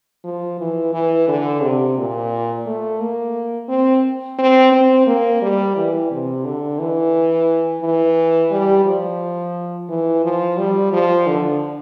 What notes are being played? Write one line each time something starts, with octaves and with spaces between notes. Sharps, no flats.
F3
E3
E3
D3
C3
A#2
A3
A#3
C4
C4
C4
A#3
G3
E3
C3
D3
E3
E3
G3
F3
E3
F3
G3
F3
D3